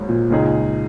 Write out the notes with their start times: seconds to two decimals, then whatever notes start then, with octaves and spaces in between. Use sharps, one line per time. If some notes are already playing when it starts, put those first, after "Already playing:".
Already playing: G#1 G#2 F#3 A#3
0.09 A#2
0.30 C#2 C#3 G#3 D#4 G#4